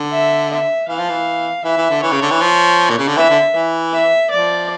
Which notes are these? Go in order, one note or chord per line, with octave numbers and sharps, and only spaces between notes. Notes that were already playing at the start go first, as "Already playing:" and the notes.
Already playing: D3
E5
E5
E3 F5
F3
E3
E3 E5
E3
D3
E3 C#5
C#3
D3
E3
F3
A#2
C#3
D3
E3 E5
D3
E3
E5
F3 D5